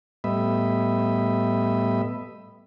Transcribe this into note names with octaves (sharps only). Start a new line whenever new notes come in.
A2 G3 B3 D#5 E5 B5